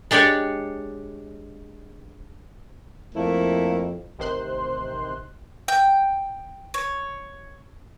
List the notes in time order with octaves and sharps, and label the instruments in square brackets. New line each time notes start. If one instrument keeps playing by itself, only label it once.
[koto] G#3 D4 G4 C#5 D5
[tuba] F2 [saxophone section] A3 A#3 E4
[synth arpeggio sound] A1 C3 D#3 C5 C6 F#6
[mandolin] G5
C#5